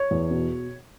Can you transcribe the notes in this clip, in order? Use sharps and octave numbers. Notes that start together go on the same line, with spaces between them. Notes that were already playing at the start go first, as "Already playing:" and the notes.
Already playing: C#5
E2
B2